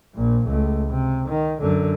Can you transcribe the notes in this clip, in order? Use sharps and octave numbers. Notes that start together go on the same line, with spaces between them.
A#1 A#2
C#2 A3
C3
D#3
F#2 D3